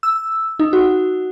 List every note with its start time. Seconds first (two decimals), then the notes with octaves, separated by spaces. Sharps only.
0.03 E6
0.59 D#4
0.73 F#4